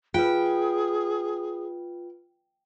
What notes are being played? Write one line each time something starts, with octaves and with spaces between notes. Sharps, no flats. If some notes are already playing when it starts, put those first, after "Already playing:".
F4 G#4 B4 G5